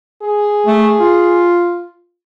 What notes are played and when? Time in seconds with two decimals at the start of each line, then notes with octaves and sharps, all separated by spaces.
0.22 G#4
0.67 A3
1.00 F4